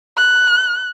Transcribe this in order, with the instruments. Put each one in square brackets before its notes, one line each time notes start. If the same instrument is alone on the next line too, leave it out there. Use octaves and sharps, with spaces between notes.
[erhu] F#6